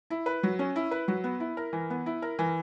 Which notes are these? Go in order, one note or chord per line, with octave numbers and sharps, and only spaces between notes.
E4
B4
F#3
C#4
E4
B4
F#3
B3
E4
A#4
E3
B3
E4
A#4
E3